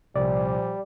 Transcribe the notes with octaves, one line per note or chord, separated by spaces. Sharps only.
C2 A#2 F3 G3 D5